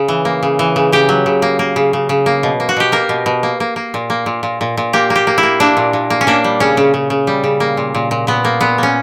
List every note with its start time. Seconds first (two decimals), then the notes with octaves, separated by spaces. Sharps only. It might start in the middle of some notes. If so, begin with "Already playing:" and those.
Already playing: C#3
0.08 E3
0.25 A#3
0.43 C#3
0.59 E3
0.76 C#3
0.92 C#3 G4
1.09 F#3
1.26 C#3
1.42 A#3
1.59 A#3
1.76 C#3
1.93 C#3
2.09 C#3
2.26 A#3
2.43 B2
2.60 A#3
2.69 F#4
2.77 B2 G4
2.92 A#3 A#4
3.09 B2
3.26 B2
3.43 A#3
3.60 A#3
3.76 A#3
3.94 A#2
4.10 A#3
4.26 A#2
4.43 A#2
4.61 A#2
4.77 A#2
4.93 A#3 G4
5.10 A#3
5.16 G4
5.27 A#3
5.38 E4
5.43 A#3
5.60 A#3 D4
5.77 A#2
5.93 A#2
6.10 A#3
6.21 C#4
6.27 A#3 D4
6.44 G3
6.60 C#3 C#4
6.77 C#3
6.94 C#3
7.10 C#3
7.27 G3
7.44 C#3
7.60 A#3
7.77 A#2
7.95 A#2
8.11 A#2
8.27 A#2 B3
8.45 A#3
8.61 A#2 B3
8.78 A#3 C#4